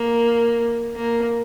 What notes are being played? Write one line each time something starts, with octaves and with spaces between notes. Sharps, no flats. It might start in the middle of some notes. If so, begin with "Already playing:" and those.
Already playing: A#3
A#3